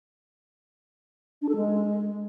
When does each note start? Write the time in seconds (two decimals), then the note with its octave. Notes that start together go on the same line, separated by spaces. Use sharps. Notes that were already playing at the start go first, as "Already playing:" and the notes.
1.42 D4
1.49 A4
1.56 G#3